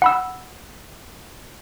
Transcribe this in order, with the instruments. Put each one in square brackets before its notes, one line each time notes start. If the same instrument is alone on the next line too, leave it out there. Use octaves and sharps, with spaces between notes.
[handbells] F#5 B5 E6